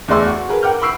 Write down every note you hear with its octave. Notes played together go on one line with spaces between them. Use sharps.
E2 A3 G#4 D5 C6 E6
F#4 C#6
G#4 A#4 B4
A#4 F#5 G5 D6 F6 G6
B5 C#6 E6 C7 D7